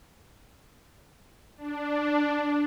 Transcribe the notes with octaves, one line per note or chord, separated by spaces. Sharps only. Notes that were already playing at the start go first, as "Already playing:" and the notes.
D4